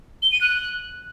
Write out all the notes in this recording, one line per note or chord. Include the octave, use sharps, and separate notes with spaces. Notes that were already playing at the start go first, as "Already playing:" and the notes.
G7
D#7
F#6